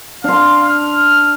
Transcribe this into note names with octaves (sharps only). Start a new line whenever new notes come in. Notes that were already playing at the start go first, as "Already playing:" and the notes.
D4 F5 C6
F6